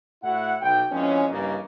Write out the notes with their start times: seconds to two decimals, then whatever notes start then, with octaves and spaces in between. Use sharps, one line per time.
0.23 A2 E4 F#4 F#5
0.61 B1 G5
0.92 F2 A#2 E3 G#3 C#4
1.29 G2 C#3 E3 A#3 D#5